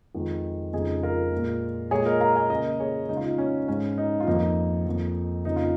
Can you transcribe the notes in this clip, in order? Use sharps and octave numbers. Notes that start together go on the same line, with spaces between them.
F2 D#3 G#3
F2 C#3 G#3 D#4 G#4
F4 A#4
A#2 G#3
A#2 G#3 G#4 C#5
A#4 D#5
F5 A#5
D#5 G#5
C#3 A#3 A#4 D#5
G#4 C#5
C#3 G#3 D#4
F4
D#4
C#4
G#2 G#3 C#4
D#4
F4
F2 F3 A#3 D#4
F2 F3 A#3
F2 C#3 A#3 D#4
F4